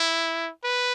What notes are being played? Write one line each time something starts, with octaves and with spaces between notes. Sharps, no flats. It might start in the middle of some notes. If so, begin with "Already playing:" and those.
Already playing: E4
B4